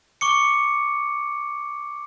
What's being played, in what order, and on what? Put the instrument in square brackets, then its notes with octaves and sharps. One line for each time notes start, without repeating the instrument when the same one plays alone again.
[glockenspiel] C#6 D6 C#7